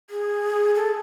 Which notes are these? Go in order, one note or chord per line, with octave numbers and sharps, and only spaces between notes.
G#4
A4